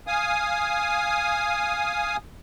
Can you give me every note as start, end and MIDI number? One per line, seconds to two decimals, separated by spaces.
0.07 2.17 77
0.07 2.17 80
0.07 2.17 87